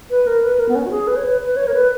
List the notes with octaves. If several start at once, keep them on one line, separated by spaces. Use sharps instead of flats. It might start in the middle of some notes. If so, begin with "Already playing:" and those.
B4
A#4
B4
A#4
B3
C#4
F#4
G#4
B4
C#5
B4
B4
C#5
A#4
B4